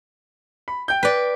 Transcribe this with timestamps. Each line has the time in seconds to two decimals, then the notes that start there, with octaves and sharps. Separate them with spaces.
0.68 B5
0.88 G5 G6
1.03 B4 D5